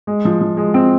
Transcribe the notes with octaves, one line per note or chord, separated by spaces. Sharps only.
G#3
F3
F3
G#3
C4